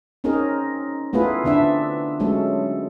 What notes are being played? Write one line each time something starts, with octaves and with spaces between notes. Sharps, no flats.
C4 C#4 D#4 G#4 A#4
A3 B3 E4 F4 G#4 B4
D3 C4 D4 E5
F#3 G#3 A3 C#4 A4